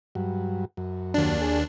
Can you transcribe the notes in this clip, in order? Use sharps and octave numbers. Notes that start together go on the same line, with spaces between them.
G2 F#3
F#2
D#2 D4
G#4